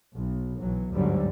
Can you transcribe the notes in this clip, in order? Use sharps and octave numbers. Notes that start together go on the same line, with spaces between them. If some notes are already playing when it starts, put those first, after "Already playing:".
B1
B1 E3 F#3
G1 D2 G#2 D3 F#3 G3